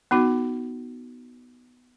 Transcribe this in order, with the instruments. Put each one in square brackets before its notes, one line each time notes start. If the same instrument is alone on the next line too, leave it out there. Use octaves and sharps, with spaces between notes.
[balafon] B3 D#4 F#4